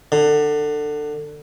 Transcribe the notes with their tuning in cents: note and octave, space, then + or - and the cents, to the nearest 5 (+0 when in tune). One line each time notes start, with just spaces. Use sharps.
D3 +20